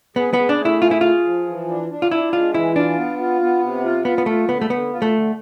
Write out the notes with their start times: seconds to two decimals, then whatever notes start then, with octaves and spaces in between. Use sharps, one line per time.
0.16 B3 G#4
0.33 B3
0.39 G#4
0.49 D4
0.60 A3
0.65 E4
0.82 F4 G#4
0.91 E4
1.01 F4 G#4
1.24 F3
1.46 E3
1.68 D4
1.89 D4
2.02 F4
2.11 D4 E4
2.32 G#3 F4
2.54 E3 E4
2.76 D4 F4
2.97 B3
3.19 F4
3.41 B3
3.62 C3
3.84 F4
4.05 B3 F4
4.18 B3
4.26 A3 F4
4.48 D3 B3
4.61 A3
4.70 D3 B3
4.92 F4
5.02 A3
5.13 D3